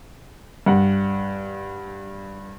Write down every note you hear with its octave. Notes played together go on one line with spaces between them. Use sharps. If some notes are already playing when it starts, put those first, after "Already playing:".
G2 F#5